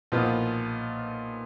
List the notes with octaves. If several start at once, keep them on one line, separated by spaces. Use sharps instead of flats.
B1 A#2 F3 B3 F4